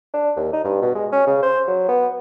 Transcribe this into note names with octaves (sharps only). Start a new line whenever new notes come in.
D4
D#2
D#4
G2
B2
G#3
C#4
C#3
C5
F#3
B3